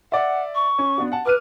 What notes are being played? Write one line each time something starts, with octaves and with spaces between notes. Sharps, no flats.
D5 E5 F#5
C#6
C#4
B3 D4 F#4
F#5 A5
B4 D6 F6 D#7